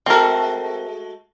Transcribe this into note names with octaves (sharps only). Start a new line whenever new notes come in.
G#3 A3 C4 F#4 A#4